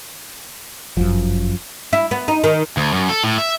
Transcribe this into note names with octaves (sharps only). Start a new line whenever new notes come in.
G1 F#2 F3
E4
B3
D#4
D#3
D2
F#2
A4
A2
E5